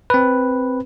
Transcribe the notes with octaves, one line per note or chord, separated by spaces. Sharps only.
C4 B4